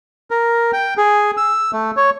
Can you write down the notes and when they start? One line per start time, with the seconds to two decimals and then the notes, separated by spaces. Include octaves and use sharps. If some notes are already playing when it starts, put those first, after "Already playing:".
0.31 A#4
0.73 G5
0.98 G#4
1.37 E6
1.73 A3
1.97 C#5